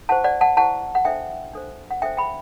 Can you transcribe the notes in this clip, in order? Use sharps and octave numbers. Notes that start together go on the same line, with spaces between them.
E4 G4 C5 F#5 A5
D5 F#5
F#5 A5
E4 G4 C5 F#5 A5
F#5
D4 A4 C5 E5 G5
D4 A4 C5
F#5
D4 A4 C5 E5 G5
G5 B5